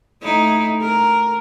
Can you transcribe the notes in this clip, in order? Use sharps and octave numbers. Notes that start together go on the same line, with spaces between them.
A3 D#4 E4
A#4